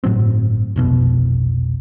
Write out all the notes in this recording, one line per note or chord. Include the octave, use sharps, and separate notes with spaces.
G1 A2 F#3 C4
F1 B1 B2